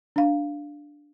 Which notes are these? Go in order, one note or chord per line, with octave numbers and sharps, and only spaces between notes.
D4 F5